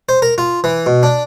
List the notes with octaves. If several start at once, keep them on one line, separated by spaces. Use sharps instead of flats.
C5
A#4
F4
E3
B2
D4